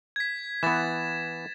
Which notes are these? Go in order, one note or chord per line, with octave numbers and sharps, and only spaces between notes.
G#6 B6
E3 B3 A6 E7